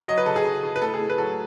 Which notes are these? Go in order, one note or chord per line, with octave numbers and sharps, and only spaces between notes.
F#3 D#5
B4
C#3 A4
G#4
C#3
C#3
B4
A2 A4
G#4
A2
B4
F#3 A4